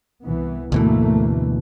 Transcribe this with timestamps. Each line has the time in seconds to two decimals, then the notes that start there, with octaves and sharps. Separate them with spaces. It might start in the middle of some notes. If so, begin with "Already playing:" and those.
0.22 C2 E3 B3
0.72 D2 G#2 B2 E3 A3 A#3